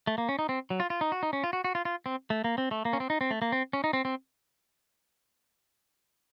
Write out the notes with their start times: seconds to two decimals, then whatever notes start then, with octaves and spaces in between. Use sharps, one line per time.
0.07 A3
0.18 A#3
0.29 C#4
0.39 D#4
0.49 C4
0.70 F#3
0.80 F4
0.90 F4
1.01 D#4
1.12 F#4
1.23 D#4
1.33 C#4
1.44 F4
1.53 F#4
1.64 F#4
1.75 F4
1.85 F4
2.06 C4
2.30 A3
2.44 A#3
2.58 C4
2.71 A3
2.85 A#3
2.93 C#4
3.00 C4
3.10 D#4
3.21 C4
3.31 A3
3.42 A#3
3.52 C4
3.73 C#4
3.84 D#4
3.93 C4
4.05 C4